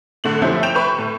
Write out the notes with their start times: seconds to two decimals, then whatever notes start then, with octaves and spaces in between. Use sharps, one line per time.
0.24 A2 D3 A3 F#7
0.42 F3 A3 C#4 E4 G4 C5
0.63 G5 G6 D7 E7 F7
0.75 B4 B5 C#6
0.98 A2